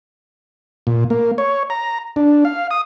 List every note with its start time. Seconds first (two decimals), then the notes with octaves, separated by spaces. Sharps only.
0.87 A#2
1.10 A#3
1.38 C#5
1.70 A#5
2.16 D4
2.45 F5
2.71 D#6